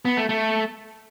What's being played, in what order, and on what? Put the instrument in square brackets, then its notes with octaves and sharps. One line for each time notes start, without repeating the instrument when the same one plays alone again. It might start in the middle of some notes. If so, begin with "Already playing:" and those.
[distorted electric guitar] B3
A3
A3